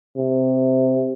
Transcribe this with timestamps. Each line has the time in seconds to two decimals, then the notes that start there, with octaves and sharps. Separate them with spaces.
0.17 C3